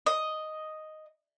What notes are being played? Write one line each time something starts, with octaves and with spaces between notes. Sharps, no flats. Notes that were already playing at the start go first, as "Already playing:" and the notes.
D#5